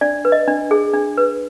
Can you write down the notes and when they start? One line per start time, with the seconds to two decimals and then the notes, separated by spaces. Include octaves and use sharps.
0.01 D4 D5
0.25 B4
0.32 D#5
0.48 D4
0.71 G#4
0.94 D4
1.18 B4